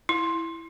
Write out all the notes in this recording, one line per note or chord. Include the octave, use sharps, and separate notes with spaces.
E4